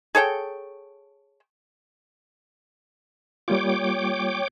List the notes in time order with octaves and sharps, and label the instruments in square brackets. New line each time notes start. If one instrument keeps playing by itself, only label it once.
[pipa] G#4 A4 C#5 G5
[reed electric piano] G3 A#3 F4 [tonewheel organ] C#5 G5 D6